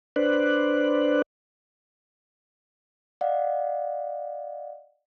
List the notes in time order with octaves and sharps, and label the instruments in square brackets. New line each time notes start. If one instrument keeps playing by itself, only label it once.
[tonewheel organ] D4 B4 C5 D5 F#6
[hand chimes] D5 D#5 F5 F#5